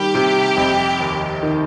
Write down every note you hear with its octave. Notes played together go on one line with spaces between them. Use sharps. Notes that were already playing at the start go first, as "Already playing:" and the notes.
Already playing: D#3 G3 A#3 G4
C3
F1
D#2
D#3